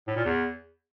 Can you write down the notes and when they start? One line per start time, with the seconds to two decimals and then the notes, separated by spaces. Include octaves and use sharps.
0.07 A2
0.16 A#2
0.24 E2